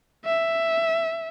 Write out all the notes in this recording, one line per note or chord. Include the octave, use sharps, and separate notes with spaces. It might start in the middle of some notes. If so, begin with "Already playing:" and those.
E5